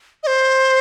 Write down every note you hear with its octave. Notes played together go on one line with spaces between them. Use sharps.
D#5
C5